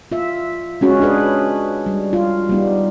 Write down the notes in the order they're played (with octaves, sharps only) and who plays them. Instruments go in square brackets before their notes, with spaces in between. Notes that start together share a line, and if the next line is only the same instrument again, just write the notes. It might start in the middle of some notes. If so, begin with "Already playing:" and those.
[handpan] F4 E5
G#3 C#4 F#4
D4 G#4 B4
G3
F4
G3 B3 D#4